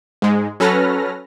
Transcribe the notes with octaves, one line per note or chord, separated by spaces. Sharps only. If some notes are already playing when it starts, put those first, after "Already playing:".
G#2 G#3
F#3 C#4 A4 B4 F6 A#6